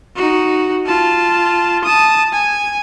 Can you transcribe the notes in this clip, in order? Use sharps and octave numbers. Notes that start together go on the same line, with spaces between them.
D#4 F#4
F4 A5
A5 D#6
G#5